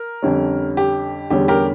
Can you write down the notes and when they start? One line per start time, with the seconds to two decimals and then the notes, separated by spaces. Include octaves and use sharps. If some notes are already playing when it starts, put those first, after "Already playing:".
Already playing: A#4
0.23 F2 D3 G3 C#4
0.77 G4
1.30 E2 D3 G3 C#4 G4
1.48 G4 A#4